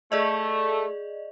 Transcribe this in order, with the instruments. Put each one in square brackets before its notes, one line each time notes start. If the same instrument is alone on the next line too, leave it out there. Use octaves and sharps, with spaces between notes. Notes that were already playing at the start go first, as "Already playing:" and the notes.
[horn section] A3 [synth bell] G#4 D5 D#5